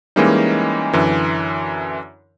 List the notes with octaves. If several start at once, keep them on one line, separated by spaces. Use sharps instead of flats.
E3 G3 G#3 A#3 C#4 D#4
F#2 D3 E3